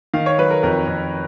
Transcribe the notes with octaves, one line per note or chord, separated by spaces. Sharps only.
D#3 F5
C#5
F#3 B4
A#4
F2 A#4
F2